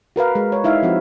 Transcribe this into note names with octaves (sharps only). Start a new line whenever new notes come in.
F#4 A#4 B4 F5
G#3
C#5
D#4 E4 E5 F5
F3 C4 F#4